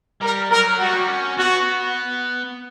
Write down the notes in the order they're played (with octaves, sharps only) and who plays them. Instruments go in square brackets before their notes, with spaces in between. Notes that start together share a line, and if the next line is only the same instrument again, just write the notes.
[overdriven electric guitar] G3 [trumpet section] A#4
[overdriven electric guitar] F#3 [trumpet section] A#4
[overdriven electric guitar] G3 [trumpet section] F#4
[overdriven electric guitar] A#3
G3
C#4
[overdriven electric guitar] B3 [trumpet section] F#4